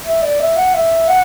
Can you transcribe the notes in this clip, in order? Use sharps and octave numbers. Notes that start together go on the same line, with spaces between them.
E5
D5
E5
F#5
E5
F#5